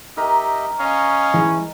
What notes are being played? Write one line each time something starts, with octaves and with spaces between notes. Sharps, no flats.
D#4 G4 A#4 D#5 E5 A#5
C#4 D#5 F5
E3 G#3 E4